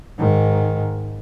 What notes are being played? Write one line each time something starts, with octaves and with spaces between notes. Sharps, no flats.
G#2 D#3